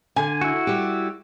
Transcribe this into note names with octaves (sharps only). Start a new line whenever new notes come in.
D3 G#5
E4 F#4
G3 G4